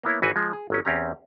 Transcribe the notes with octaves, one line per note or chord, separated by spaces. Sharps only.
A#3 B3 E4 C#5
G#1 E3 C4 F#4 B4 G#5
F3 G#3
G#4
G1 F#3 C#4
E2 C4 C#4 G4 A#5